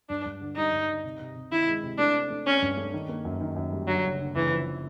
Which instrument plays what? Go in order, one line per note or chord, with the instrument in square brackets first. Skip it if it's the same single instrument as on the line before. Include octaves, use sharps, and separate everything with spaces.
[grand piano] G2 [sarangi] D4
[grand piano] G2
D3
[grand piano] G3 [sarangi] D#4
[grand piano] G2
D3
C3
C3
C3
[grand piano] D#3 [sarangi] E4
[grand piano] G#3
C3
[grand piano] A3 [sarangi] D4
[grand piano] C4
A3
[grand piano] C4 [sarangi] C#4
[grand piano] G2
A3
D#3
A#3
F#2
D#3
F#2
G3
[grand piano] D3 [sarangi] F#3
[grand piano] F#1
D3
[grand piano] F#1 [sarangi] E3
[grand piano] F3